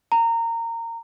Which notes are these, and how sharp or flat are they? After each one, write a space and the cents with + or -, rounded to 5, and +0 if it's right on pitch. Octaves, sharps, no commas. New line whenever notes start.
A#5 -20